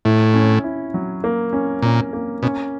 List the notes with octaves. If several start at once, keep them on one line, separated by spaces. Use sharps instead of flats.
A2 E4
C#4
E4
F#3
A#3
C#4
A#2 C#4
A#3
B2 C#4